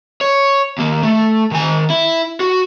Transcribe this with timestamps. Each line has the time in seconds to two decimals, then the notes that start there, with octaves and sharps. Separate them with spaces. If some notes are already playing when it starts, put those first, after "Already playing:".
0.21 C#5
0.78 D#2 A#3
1.03 A3
1.51 D#3 G#5
1.90 E4
2.40 F#4